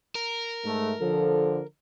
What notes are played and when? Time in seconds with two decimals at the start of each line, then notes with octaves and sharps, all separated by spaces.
0.15 A#4
0.65 G#2 A3
1.01 D3 F3 A4